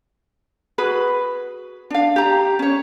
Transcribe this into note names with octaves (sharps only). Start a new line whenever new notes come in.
F#4 G#4 B4 B5
D4 F5
G4 A#5
C#4 C#5